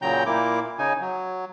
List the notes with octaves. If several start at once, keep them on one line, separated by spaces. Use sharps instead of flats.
A#2 C#3 F#3 G5 A#5 G6
A#2 A#3 E4 D6
C#3 D#4 G#5
F#3